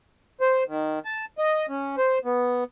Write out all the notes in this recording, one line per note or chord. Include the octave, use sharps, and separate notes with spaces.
C5
D#3
A5
D#5
C#4
C5
B3